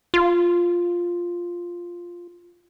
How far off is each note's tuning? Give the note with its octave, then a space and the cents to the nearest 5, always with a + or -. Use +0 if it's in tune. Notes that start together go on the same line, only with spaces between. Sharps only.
F4 +0